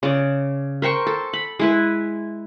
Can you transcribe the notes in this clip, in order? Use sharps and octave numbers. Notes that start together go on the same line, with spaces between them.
C#3 D5
A#4 C5 G5 C#6
A4
B5
G#3 E4 B4